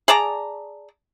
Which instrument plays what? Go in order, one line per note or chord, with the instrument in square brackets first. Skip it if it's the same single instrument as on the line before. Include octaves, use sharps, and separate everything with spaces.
[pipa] G#4 D5 A5 A#5